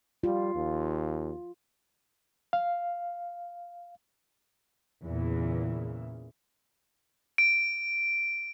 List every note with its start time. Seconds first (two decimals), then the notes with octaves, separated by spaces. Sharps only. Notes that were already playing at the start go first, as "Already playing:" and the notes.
0.24 G3 F4
0.55 D#2
2.53 F5
5.05 E2 A#2 C#3 E3
7.38 D7